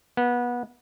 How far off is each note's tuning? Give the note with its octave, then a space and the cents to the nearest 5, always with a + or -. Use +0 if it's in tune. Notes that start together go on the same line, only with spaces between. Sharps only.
B3 -25